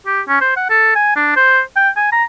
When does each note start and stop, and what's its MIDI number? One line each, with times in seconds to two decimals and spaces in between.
0.07 0.21 67
0.28 0.38 61
0.41 0.52 72
0.57 0.69 78
0.70 0.93 69
0.96 1.16 80
1.16 1.36 62
1.36 1.61 72
1.76 1.90 79
1.96 2.10 80
2.12 2.24 82